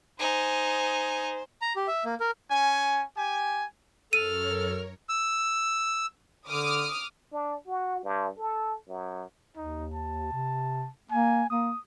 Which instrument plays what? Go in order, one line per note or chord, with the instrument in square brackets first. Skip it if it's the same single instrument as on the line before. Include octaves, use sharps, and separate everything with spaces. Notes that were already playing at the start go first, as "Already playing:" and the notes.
[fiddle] D#4 G#5 [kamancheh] C5
[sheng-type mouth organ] A#5
G4
E5
A#3
A#4
[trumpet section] C#4 G#5
G4 G#5
[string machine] F#2 A#4 C#5 [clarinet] A4 [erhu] F6 [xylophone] D#7
[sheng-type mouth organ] E6
[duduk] D3 [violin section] D6 D#6 F6
[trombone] D4
F#4
G2
A4
F#2
[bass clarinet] D#2 [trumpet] D#4
[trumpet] A5
[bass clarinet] C3
[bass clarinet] A#3 [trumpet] G#5
[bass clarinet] A#3 [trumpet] D#6